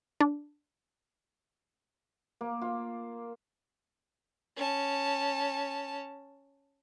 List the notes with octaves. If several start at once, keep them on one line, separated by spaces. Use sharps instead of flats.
D4
A#3
F4
C#4 A5